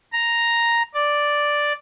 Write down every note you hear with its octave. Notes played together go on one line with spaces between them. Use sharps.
A#5
D5